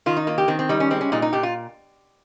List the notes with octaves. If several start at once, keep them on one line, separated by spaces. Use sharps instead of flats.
D#3 F4
D#4
A#3 F4
G4
D#3 C4
C4
G3 D#4
C#4
G#3 C4
C#4
A#2 D#4
D#4
A#2 G4
F4